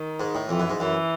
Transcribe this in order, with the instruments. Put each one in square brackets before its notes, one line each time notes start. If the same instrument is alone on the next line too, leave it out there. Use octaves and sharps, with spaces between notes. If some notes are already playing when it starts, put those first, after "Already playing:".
Already playing: [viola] D#3
[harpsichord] G#2
A2
[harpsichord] F2 [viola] E3
[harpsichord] F#2
G#2
[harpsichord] F#2 [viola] E3